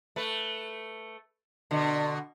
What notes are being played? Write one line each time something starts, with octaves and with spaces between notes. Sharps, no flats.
A3 B4
B2 D3